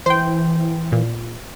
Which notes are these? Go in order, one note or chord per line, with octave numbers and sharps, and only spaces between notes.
E3 C5 G5
A#2